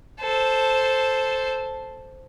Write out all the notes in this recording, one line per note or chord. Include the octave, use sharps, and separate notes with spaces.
A4 C5